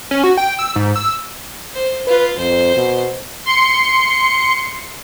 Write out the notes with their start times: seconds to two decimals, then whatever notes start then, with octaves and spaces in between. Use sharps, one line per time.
0.11 C#4
0.24 F#4
0.37 G5
0.59 E6
0.76 G#2
0.96 E6
1.73 C5
2.07 F4 B4
2.38 F2 C5
2.76 B2
3.46 C6 C#7